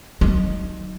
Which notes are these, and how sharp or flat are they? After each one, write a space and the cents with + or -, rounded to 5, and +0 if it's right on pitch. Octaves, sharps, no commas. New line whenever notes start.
F#3 +0 D#4 +0